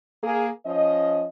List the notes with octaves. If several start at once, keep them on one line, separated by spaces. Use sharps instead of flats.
A#3 G#4
F3 C#4 D#5